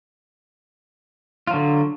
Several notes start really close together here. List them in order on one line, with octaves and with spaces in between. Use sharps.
F4 F#3 D3